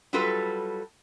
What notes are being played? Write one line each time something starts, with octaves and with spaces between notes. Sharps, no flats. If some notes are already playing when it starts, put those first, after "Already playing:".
F#3 G3 F4 F#4 A4 B4